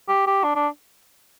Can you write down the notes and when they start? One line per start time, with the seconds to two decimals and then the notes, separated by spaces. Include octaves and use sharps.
0.09 G4
0.27 G4
0.44 D4
0.56 D4